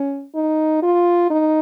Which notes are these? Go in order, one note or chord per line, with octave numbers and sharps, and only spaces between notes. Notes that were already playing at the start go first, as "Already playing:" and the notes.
Already playing: C#4
D#4
F4
D#4